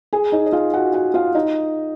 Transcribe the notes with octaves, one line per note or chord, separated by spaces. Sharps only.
G#4 G#5
D#4 D#5
D#5
F4 F5
F#4 F#5
F#4 F#5
F4 F5
D#4 D#5